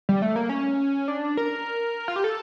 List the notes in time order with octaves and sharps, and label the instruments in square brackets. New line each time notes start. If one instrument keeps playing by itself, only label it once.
[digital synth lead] G3
A3
A#3
C#4
D4
A#4
F4
G4
A4